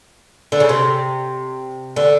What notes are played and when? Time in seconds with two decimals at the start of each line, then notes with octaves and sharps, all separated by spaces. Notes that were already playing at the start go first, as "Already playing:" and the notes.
0.52 D3
0.60 C#3
0.69 C3
1.96 D3